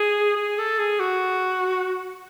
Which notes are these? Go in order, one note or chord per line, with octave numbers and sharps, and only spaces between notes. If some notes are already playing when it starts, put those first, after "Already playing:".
Already playing: G#4
G#4
A4
G#4
F#4